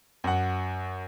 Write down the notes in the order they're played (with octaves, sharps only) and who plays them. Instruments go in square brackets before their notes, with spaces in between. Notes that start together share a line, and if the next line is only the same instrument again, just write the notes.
[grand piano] F#2 F#5